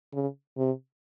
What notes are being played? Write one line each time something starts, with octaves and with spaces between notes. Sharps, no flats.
C#3
C3